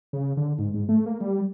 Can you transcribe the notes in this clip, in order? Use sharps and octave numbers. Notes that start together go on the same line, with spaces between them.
C#3
D3
G#2
G#2
A3
A#3
G3